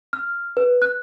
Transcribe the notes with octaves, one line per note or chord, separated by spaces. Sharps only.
F6
B4
F#6